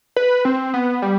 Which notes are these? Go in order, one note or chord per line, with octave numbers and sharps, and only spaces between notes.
B4
C4
B3
G3